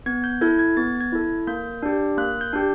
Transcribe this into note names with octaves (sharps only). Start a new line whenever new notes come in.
B3 G#6
G6
E4 A4 G#6
G#6
B3 A6
G#6
E4 A4
A#3 G6
D4 G4
A#3 F#6
G6
D4 G4